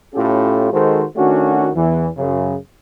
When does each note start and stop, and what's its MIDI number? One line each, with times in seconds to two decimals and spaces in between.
0.14 0.70 45
0.14 0.70 61
0.14 0.70 64
0.14 0.70 65
0.14 0.70 67
0.14 0.70 69
0.72 1.04 51
0.72 1.04 56
0.72 1.04 66
0.72 1.04 69
0.72 1.04 72
1.16 1.70 51
1.16 1.70 57
1.16 1.70 61
1.16 1.70 62
1.16 1.70 66
1.76 2.08 40
1.76 2.08 52
2.17 2.56 42
2.17 2.56 49